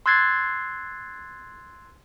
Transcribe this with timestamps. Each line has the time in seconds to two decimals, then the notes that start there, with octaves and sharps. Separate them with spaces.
0.06 C6 E6 F#6 G#6 A6 C7